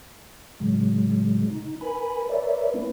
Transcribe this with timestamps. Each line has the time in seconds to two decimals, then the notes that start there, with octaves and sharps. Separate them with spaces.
0.60 A2 C#3 F#3 G#3
1.50 D#4
1.81 A#4 B4 G#5 B5
2.29 A#4 B4 C#5 D5 E5
2.74 A#3 B3 C#4 E4 B4